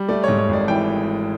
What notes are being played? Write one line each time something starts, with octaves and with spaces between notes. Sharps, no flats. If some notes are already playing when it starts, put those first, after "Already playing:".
Already playing: G3
A3 D5
G#2 C#5
C#5
G#1 D5
E3 G5